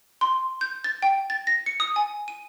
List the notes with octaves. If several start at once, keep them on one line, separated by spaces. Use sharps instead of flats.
C6
G6
A6
G5
A6
A#6
C#7
D#6
G#5
D#7